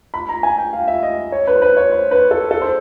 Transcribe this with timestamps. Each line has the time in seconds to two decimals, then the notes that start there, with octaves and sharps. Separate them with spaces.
0.14 B5
0.29 A#5
0.43 G#5
0.58 G5
0.73 F5
0.88 E5
1.03 D#5
1.32 C#5
1.47 B4
1.56 C5
1.62 B4
1.77 C#5
1.91 C5
2.11 B4
2.31 A4
2.51 A4
2.62 C5